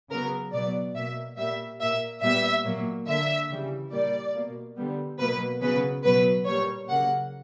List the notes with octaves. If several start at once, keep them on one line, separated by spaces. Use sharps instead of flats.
C#3 F#3 B3 A#4
B2 F#3 B3 D5
B2 A#3 E5
A#2 G3 A#3 E5
A#2 A#3 E5
A#2 G3 B3 E5
A#2 F#3 A#3
D3 A#3 E5
C#3 E3 G3
A#2 G3 A#3 D5
B2 A#3
D3 G3 B3
B2 F#3 A#3 B4
C#3 F#3 B3 B4
B2 F#3 B3 B4
A#2 G3 A#3 C#5
C#3 F#3 A#3 F#5